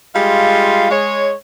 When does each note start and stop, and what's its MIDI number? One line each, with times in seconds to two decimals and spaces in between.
0.15 0.89 55
0.15 0.89 56
0.15 0.89 65
0.15 0.89 77
0.91 1.33 56
0.91 1.33 73